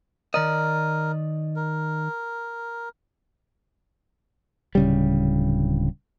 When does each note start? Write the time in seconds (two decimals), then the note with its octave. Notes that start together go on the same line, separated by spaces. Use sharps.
0.34 D#3 A#4 D5 D#5
1.56 A#4
4.75 D1 C#3 G3